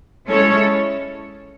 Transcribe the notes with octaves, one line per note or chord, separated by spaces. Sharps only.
G#3 C#4 E4 A4 C#5